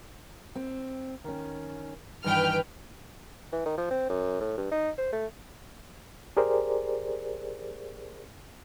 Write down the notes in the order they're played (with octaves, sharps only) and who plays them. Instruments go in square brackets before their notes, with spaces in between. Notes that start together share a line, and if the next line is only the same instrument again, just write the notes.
[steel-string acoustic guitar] C4
D#3 C#4
[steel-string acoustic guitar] G2 D#3 E3 [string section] B4 G5 F6
[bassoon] E3
D#3
F3
C4
F#2
A2
G2
D#4
C5
A3
[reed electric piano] G4 G#4 A#4 C5 D5